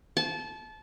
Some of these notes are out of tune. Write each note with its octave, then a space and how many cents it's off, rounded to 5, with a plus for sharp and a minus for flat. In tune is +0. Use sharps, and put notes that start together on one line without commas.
A5 -25